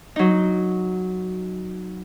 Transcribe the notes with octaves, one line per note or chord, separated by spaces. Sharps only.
F#3 D#4